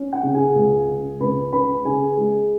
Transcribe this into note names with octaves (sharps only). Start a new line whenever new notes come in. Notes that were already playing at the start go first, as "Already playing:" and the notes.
Already playing: C#4
F#5
C#3
G#4 G#5
C#2
C#3
C#2 B4 B5
C#4 B4 B5
C#3 G#4 G#5
G#3